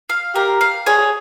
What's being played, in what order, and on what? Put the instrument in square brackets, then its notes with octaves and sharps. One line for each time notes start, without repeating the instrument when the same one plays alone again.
[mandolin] F5
[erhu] G4 [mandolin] A#4
[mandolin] F5
[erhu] G#4 [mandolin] C#5